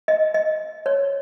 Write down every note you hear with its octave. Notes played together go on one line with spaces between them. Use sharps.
D#5
D#5
C#5